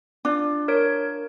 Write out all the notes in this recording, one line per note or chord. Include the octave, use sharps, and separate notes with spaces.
D4 F4
A#4 C#5 D7